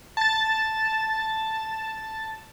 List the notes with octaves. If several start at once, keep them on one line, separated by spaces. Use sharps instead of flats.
A5 A6